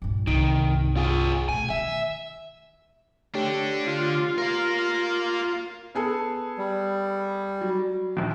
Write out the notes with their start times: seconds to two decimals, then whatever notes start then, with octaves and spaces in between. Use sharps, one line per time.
0.02 A#1 G2
0.27 C2 G2 D#3
0.96 F4 G#4
1.49 B2 A3 G#5
1.70 D#3 E5
3.35 D3 A3 D4 G4 C#5
3.87 F4
4.38 F4 A#4 F5
5.95 B3 G#4 A4
6.58 G3
7.61 F#3
8.17 A#1 D#2